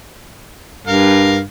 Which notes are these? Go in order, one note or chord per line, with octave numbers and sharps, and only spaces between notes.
G2 A#4 F5